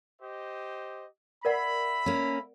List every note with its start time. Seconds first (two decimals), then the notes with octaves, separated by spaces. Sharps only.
0.22 G4 C5 D#5
1.45 A#4 D5 E5 F#5 B5
2.06 A#3 C#4